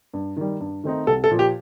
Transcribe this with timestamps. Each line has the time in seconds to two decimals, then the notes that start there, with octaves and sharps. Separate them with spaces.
0.13 G2
0.37 D#3 G3
0.60 G2
0.84 D#3 A3 C4 D#4
1.07 C2 A4
1.24 A4
1.31 A#2 F3
1.39 G4